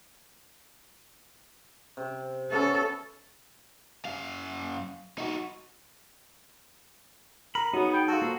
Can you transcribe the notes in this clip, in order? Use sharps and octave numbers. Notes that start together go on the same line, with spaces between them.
C3
A3 B3 C#4 A4
F#2 F5
D#4 F#4
A#4 B5
F#3 B3 D#4 G#4
G5
F4 F#4 A4
A#3 C5